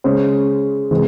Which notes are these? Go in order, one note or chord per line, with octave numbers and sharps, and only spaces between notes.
C#3 G#3 C#4 G#4 C5
C3 E3 G#3 C4